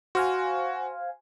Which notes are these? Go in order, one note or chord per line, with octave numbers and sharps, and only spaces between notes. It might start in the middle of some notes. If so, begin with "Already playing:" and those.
F#4 C5 F5 G#5